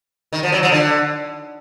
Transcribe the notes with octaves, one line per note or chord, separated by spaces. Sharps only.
D#3
F3
F#3
F3
D3